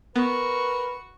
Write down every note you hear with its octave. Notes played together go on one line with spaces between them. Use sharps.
B3 F#4 A#4 B4 C#6